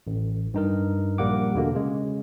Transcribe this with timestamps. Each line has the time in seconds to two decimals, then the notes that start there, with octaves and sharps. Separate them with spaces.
0.07 A1
0.54 G2 D#4 A#4
1.18 A#1 G3 A#3 F#5 D6
1.54 E2 B2 D3 A#3
1.75 C#3 G#3